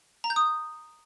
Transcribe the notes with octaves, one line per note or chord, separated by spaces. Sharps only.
A#5
G6
D#6